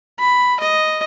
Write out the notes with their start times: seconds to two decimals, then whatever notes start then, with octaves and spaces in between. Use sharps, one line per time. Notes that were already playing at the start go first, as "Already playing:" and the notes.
0.19 B5
0.60 D#5